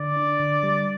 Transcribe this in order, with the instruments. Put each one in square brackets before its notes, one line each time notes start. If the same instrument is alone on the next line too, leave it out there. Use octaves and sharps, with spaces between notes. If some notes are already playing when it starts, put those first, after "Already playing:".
Already playing: [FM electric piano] D3 [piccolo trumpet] D5
[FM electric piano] D4
D3
G3